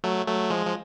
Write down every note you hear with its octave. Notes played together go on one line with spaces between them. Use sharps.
F#3 A3
F#3 A3
F3 G#3
F3